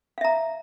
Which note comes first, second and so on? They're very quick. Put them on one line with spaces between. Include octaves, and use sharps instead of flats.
F5 E5 A#5